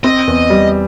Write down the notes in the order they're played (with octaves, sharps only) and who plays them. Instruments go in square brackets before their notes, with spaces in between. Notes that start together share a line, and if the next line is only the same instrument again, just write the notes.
[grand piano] C4 [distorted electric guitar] D#5
[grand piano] E2
G3